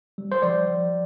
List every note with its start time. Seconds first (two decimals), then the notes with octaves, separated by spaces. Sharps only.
0.18 G3
0.32 C5
0.42 F3 D5
0.68 F3